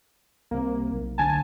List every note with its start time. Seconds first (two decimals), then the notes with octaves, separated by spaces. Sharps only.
0.51 C2 C3 A#3
0.92 B1
1.18 D2 G#5 A5